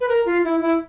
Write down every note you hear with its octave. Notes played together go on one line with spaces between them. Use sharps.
B4
A#4
F4
E4
E4